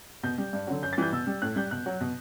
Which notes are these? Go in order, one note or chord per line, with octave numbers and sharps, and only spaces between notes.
B2 G6
G3
G2
D3 F#3
F#2 G6
A6
E3 G3 G6
B2 E6
G3
A2 F#6
G3 G6
B2 F#6
F#3
B2